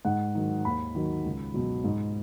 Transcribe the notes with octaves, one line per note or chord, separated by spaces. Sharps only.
G#2 F#5
D#3 F#3
D#2 B5
D#3 F#3
C#2
B2 F#3
G#2